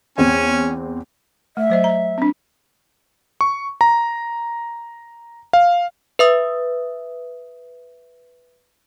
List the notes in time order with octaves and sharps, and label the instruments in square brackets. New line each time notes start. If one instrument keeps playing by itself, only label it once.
[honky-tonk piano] E2 C4 [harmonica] C#4 G#5
[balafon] A3 [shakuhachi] E5
[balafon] F#3 C5 D#5
A#5
C4 D4
[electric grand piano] C#6
A#5
F5
[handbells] B4 E5 D#6